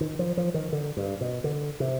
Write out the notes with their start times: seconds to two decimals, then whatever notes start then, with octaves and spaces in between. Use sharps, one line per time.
0.01 D#3
0.19 F3
0.37 F3
0.54 D#3
0.72 D3
0.97 G2
1.21 B2
1.44 D3
1.80 C3